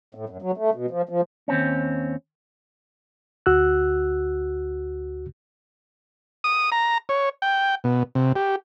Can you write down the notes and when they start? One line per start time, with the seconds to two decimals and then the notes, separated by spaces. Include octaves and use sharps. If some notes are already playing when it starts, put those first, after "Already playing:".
0.15 A2
0.29 F#2
0.42 F#3
0.57 A3
0.74 B2
0.91 F3
1.09 F3
1.48 D#2 C4 C#4
3.46 D2 F#4 E6 F#6
6.44 D#6
6.72 A#5
7.09 C#5
7.42 G5
7.84 B2
8.15 C3
8.36 G4